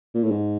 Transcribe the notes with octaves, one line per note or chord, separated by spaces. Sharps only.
A#2
A2
G#2